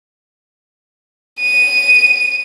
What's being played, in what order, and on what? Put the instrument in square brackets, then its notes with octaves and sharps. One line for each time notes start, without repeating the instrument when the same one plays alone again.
[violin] D#7